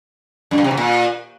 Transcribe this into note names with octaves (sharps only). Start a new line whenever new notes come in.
F#2
G2
C3
B2
A#2